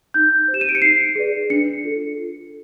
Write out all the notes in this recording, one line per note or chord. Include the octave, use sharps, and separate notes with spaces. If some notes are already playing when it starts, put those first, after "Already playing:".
D#4 G6
C5
G4 E7
D#7
D7
C#7
D#4 C7
G#4 B4 D5
D4 C#7
F4 A4